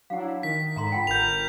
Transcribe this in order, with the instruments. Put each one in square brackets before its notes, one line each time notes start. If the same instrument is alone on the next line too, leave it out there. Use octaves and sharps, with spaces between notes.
[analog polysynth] F#3 D4 E4 [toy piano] F5 F#5
[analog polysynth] D#3 [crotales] B6
[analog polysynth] G#2 D3 [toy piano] E5 A#5 C6
[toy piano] F4 F#5 G5
[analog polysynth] G1 A#4 [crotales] G6 F7